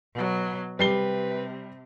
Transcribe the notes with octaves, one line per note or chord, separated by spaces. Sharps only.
B2 F#3
C3 G3 B4 C7 G7